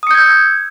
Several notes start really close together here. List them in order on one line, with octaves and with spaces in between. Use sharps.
D#6 C#7 G6 G#6 E6